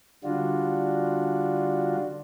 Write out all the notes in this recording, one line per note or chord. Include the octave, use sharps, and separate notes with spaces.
D3 G3 D4 F4 F#4